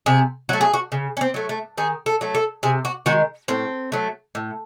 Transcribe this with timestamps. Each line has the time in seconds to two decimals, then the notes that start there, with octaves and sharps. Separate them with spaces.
0.06 C3 G#4
0.49 F#3 A3 F#4
0.61 G#4
0.74 F#4
0.92 C#3
1.17 C#4
1.21 C4
1.34 F#3 A3
1.49 A3
1.78 D#3 G#4
2.06 A4
2.21 F#3 A3
2.35 A4
2.63 C3 G#4
2.85 F#4
3.06 D#3 G#3 F#4
3.48 A2 C4
3.92 F#3 A3
4.35 A2